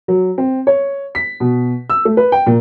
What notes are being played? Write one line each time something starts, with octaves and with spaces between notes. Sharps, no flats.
F#3
C4
C#5
B6
B2
E6
A3
B4
G5
A#2